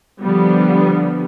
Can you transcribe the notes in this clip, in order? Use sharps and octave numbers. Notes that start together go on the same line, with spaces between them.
D3 F3 G3 B3